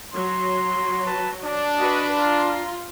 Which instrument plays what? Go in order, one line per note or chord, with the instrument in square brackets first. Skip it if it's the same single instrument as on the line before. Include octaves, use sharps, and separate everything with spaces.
[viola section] F#3 [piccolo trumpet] C6
[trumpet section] B4 A5
D4
[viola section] F#4 B4 [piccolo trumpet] D#5
[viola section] F4 [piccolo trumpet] A#5